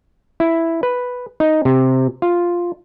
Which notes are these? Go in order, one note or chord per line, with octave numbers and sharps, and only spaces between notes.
E4
B4
D#4
C3
F4